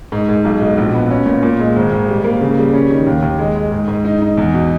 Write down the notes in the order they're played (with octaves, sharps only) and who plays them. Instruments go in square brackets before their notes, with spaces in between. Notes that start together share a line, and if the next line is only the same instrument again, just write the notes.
[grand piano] G#2
G#2
B1
B2
A#1
B3
C#4
A#2
A#2
G#3
G#1
G#1
G3
A#3
C#3
G3
C#4
D#3
D#2
D#2
G#3
G#3
G#2
G#2
D#4
D#4
E2
B2